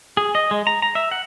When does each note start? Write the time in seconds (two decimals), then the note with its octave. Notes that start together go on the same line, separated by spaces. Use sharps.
0.17 G#4
0.35 D#5
0.51 G#3
0.67 A#5
0.82 A#5
0.95 E5
1.11 F#5